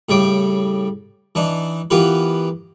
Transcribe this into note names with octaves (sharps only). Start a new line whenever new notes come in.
A2 C#3 G3 G5 D6
E3 D4 D#4
E3 B3 F4 G4 A#4 B4